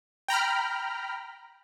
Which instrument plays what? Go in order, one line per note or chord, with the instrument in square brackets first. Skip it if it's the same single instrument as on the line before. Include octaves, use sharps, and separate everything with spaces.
[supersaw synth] G5 A#5 B5 F6